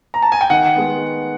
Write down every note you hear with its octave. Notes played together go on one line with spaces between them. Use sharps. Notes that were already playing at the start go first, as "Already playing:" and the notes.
A#5
A5
G#5
G5
D#3 F#5
G#3 B3